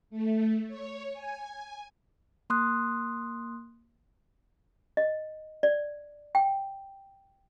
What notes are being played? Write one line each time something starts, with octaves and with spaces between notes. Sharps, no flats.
A3
C#5
G#5
A#3 C6 D#6 F#6
D#5
D5
G5